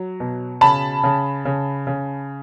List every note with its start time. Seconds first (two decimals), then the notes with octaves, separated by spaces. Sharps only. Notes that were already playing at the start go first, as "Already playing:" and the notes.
Already playing: F#3
0.20 B2
0.61 C#3 A5 B5
1.04 C#3
1.45 C#3
1.87 C#3